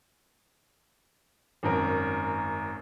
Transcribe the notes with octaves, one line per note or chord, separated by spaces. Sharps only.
G#1 F#2 A#4